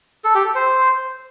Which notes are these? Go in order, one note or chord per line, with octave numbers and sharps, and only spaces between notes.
A4
G4
A4
C5